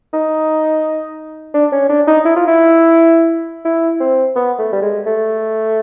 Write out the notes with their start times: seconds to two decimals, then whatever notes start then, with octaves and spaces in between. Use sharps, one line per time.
0.14 D#4
1.54 D4
1.73 C#4
1.89 D4
2.08 D#4
2.26 E4
2.37 F4
2.48 E4
3.65 E4
4.00 C4
4.36 B3
4.59 A3
4.72 G3
4.82 G#3
5.06 A3